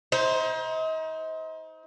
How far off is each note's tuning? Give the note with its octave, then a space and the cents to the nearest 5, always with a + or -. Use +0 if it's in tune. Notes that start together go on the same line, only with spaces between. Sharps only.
D#4 +35 C5 +0